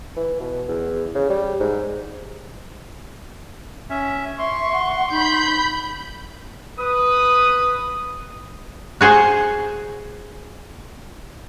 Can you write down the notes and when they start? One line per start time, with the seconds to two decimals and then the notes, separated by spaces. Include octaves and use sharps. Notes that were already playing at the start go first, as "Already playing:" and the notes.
0.17 E3
0.40 B2
0.68 E2
1.15 C#3
1.30 G3
1.60 G#2
3.90 C#4 E5
4.39 E5 C6 C#6
4.73 F#5
5.11 D#4 B5 G6
6.79 B4 D#6
9.01 F#4 G#4 C5